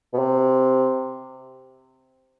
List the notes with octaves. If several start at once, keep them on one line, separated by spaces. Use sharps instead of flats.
B2
C3